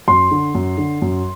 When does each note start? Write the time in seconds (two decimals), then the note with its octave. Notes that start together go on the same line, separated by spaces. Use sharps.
0.08 F#2 C6
0.31 D3
0.55 F#2
0.78 D3
1.02 F#2